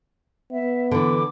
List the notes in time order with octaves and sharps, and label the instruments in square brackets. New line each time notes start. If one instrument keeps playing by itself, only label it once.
[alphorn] B3 [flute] E5
[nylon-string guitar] D3 E3 [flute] D6